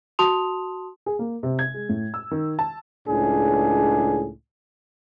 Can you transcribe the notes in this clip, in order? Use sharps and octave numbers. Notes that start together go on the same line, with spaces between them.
F#4 A5 C6 D#6 F7
G#4
A#3
C3
G#6
G#3
A2
E6
D#3
A5
C#2 A2 D4 G#4